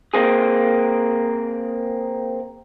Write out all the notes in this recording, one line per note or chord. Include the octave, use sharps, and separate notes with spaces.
A#3 C4 G#4